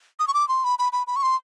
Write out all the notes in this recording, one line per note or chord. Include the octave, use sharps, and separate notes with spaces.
D#6
C#6
D6
C6
B5
B5
B5
B5
C#6
C6